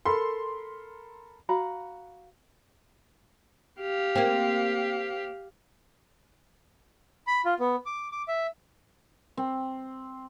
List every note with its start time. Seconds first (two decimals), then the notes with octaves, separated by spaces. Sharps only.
0.05 A4 A#4 B5 C6
1.49 F#4 F5 A#5 B5
3.81 G4 F5
4.16 A#3 C4
7.27 B5
7.45 F4
7.60 B3
7.86 D6
8.12 D6
8.28 E5
9.37 C4